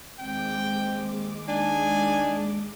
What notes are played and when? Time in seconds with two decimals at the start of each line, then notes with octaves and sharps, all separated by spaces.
0.19 D#2 G#3 C4 G5 D6
1.48 D4 D#4 G#5